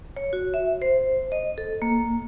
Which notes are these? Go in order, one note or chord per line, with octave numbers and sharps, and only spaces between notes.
C#5
F#4
E5
C5
D#5
A4
A#3